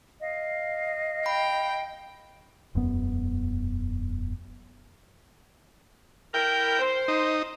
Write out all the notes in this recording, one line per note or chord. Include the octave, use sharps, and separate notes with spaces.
D#5 F5
G5 B5
E1 F#2 B3
E4 A#4 G5
C5
D#4